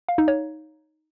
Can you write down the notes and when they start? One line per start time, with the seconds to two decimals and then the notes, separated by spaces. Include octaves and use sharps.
0.09 F5
0.18 D#4
0.28 C#5